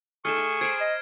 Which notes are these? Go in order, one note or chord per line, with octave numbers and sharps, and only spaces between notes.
A3 D#4 G#4 A4 C#6 F6 E7
E5
C5 A#5 B5 G#6 C7 D7
D#5